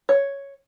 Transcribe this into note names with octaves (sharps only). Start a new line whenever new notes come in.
C#5